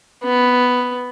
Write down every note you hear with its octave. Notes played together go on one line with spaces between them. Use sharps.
B3